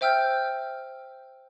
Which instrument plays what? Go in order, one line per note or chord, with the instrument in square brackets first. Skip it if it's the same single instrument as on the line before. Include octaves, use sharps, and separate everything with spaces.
[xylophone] C5 E5 G5 E6 F6 G6